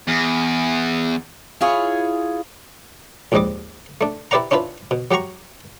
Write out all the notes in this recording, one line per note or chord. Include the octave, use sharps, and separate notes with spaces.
E2
E4 F4 G#4 C#5
A#1 D#2 G#2 G3 D#5 D6
A3 D4
E4 G4 B4 D5 F#5 A#5
C#4 D4 E4 F4 B4
B2
F#3 G4 F#5 A#5 C#6